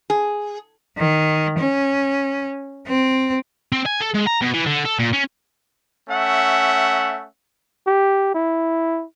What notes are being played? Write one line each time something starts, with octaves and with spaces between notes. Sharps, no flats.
G#4
D#3
C#4
C4
C4
G#5
A4
G#3
A#5
B2
E3
D3
A4
A#2
C#4
A3 C#4 E5 F#5
G4
E4